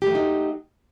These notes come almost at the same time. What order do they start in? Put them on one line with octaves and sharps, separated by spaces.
G4 A3 F#3 D#4